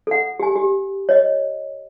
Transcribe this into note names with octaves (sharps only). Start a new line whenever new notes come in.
A4 F#5
G4 G#5
G4
C#5 D#5